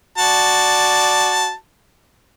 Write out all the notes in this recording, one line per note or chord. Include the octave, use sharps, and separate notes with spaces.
F#4 D5 A5